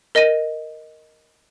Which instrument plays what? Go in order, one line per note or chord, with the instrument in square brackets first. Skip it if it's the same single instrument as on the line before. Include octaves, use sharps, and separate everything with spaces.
[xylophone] A#4 D#5 A#6 D#7